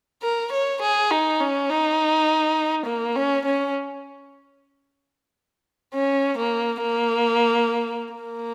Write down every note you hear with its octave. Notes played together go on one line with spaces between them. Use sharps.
A#4
C#5
G#4
D#4
C#4
D#4
A#3
C#4
C#4
C#4
A#3
A#3
A#3